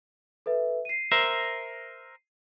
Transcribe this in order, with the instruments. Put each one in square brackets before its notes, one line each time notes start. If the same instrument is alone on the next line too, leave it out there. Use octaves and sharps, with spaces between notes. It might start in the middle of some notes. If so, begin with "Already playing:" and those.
[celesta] A4 B4 E5
C7 D#7
[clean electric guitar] A#4 C5 E5